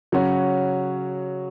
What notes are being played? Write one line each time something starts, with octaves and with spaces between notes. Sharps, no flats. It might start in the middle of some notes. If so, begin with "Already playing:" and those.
C#3 F#3 C#4 F#4